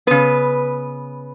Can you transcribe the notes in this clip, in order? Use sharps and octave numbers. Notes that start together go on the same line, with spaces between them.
C#3 B3 B4